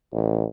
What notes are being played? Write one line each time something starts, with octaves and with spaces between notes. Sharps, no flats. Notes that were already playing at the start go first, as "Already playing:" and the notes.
A1